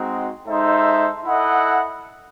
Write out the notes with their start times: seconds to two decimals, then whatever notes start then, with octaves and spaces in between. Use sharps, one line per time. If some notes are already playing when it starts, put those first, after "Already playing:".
Already playing: G#3 C4 D#4 F#4
0.47 G#3 D#4 A4 C5 E5
1.25 E4 A4 D#5 F#5